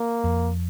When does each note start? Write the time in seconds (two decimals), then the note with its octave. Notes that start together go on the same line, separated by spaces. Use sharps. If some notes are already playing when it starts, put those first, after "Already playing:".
Already playing: A#3
0.24 F2